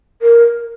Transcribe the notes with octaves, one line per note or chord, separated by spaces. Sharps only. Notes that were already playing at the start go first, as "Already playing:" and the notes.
A#4